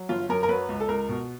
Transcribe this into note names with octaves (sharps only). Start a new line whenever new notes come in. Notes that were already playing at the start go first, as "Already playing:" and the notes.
Already playing: F#3
G1 F4
F#2 A#4
A#4
F#3 B4
C#2
A4
C#2 A#4
B2